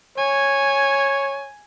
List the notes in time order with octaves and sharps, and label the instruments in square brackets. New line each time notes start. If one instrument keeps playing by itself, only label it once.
[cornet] C#5 [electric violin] G#5